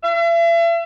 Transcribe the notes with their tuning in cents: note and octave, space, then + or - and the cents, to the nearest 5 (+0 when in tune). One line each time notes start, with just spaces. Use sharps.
E5 +40